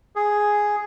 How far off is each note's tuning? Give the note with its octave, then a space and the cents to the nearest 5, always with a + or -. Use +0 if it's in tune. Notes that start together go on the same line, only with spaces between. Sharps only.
G#4 +0